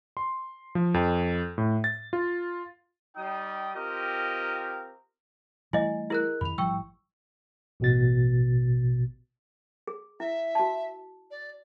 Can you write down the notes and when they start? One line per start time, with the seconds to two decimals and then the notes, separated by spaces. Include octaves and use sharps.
0.17 C6
0.75 F3
0.94 F2
1.58 A2
1.84 A6
2.13 F4
3.16 G3 D#4 G5 D#6
3.75 C4 F4 G4 A#4 D#5
5.73 E3 G3 A3 E4 D#5 G#5
6.10 E4 G#4 A#4 F#6
6.41 F2 D#3 B5 F7
6.58 G#1 F3 G3 G5 C#6 E6
7.80 A1 B2 A6
9.87 G#4
10.20 E4 E5
10.55 F#4 A5
11.31 D5